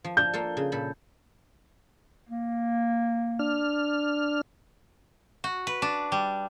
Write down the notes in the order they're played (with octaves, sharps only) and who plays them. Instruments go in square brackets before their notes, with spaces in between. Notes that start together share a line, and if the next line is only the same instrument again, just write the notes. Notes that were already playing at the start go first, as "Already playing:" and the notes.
[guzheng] F3
[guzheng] D4 [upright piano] G6
[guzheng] A#3 F4 A4
C#3
A#2 A4 B5
[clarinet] A#3
[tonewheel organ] D4 F6
[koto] F#4
B4
D4
G3